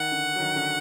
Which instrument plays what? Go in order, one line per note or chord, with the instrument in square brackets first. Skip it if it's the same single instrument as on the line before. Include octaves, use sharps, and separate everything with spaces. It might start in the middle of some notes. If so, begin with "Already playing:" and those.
Already playing: [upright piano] D#3 [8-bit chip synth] F#5
[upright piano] D3
F#3
D#3
D3